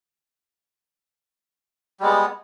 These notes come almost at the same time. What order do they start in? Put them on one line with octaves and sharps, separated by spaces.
G3 G#3 B3